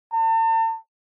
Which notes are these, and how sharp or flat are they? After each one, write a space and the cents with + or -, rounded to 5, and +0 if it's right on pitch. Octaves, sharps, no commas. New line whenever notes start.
A5 +45